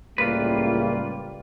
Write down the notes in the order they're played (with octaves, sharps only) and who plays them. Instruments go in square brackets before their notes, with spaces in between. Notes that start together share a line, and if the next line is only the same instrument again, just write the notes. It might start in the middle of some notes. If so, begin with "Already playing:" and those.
[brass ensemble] C#2 A2 [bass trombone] G3 [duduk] A#3 [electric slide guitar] F4 B4